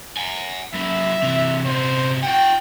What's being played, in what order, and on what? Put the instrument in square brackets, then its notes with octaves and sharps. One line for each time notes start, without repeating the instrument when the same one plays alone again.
[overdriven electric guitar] F#5 G#5
[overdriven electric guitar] F#2 E4 [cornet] E5
[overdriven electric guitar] C3 E3
[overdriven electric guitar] C3 B3 [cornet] C5
[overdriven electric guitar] F4 F#5 [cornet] G5